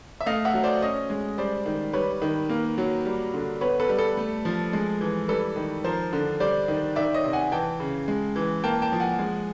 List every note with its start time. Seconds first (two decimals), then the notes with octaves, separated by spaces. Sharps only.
0.21 E5
0.26 A3 D#5 F5
0.45 E5 F#5
0.54 F#3
0.63 C5 D5
0.82 C#4 C#5 D#5
1.10 G#3
1.38 G3 C5 D5
1.66 D#3
1.93 G3 B4 C#5
2.22 D#3
2.49 A#3
2.78 F#3
3.05 G3
3.34 D3
3.61 B3 B4 C#5
3.80 A4 B4
3.89 G3
3.99 A4
4.17 A3
4.45 F3
4.73 G#3
5.01 E3
5.28 G3 A4 B4
5.56 D#3
5.84 F3 A#4 C5
6.13 D3
6.40 G3 C5 D5
6.68 D#3
6.96 D#3 D5 E5
7.14 C#5 D#5
7.24 C3
7.33 F#5 G#5
7.52 E3 G5 A5
7.80 C#3
8.08 G#3
8.36 E3
8.64 A#3 G5 A5
8.82 G5 A5
8.92 F3
9.00 F#5 G#5
9.19 G#3